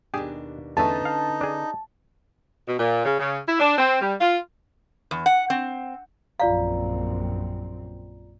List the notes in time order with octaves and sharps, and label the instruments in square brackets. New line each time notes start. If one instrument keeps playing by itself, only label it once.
[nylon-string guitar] D#2 B2 D4 [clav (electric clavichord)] G4 G#4
[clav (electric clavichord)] E2 A3 [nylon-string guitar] D3 C#4 B4 [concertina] D#4 [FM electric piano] A5
[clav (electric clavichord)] F5
D4 G#4
[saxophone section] B2
A#2
C#3
C#3
E4
D4
C4
G3
F4
[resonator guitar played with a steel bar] E2
F#5
C4
[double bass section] A#1 F#2 C4 [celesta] F4 D5 A#5 [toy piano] F5